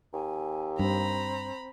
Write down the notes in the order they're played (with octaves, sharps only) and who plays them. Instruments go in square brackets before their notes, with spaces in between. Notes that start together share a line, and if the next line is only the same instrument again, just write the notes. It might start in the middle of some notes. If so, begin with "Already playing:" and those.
[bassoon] D#2 [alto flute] G#5
[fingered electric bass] G2 [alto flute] C4 [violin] A#5 B5